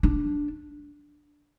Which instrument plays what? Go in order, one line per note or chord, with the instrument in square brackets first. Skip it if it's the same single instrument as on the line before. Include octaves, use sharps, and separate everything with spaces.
[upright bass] D4